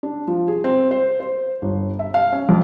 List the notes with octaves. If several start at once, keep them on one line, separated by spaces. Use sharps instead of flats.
D4
F3
G#4
C4
C5
C5
G1
E5
F5
C#4
F2